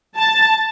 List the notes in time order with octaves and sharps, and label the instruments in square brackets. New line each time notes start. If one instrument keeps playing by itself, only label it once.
[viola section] A5